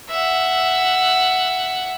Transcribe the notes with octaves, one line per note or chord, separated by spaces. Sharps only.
E5 F#5